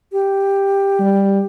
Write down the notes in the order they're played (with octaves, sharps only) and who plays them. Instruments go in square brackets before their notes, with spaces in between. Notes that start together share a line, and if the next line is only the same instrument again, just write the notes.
[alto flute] G4
[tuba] G3